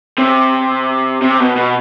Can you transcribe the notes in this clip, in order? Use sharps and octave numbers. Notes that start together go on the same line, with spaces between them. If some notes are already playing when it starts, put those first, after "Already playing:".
C3
C3
B2
B2